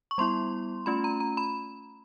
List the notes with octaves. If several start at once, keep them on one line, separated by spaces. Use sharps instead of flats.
C#6
G3 B3 E4 C6
A3 C#4 F4 B5
A#5
A#5
B5